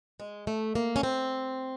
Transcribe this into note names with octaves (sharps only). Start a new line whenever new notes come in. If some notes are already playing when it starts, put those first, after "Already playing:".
G#3
A3
A#3
C#4
C4